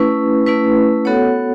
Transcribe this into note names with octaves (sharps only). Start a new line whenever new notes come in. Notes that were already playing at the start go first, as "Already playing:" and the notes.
Already playing: A3 C#4 E4 B4
A3 C#4 E4 B4
B3 F#4 A4 C#5 F#5